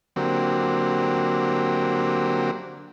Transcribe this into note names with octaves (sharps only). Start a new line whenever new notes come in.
D3 F#3 A#3 C4 G4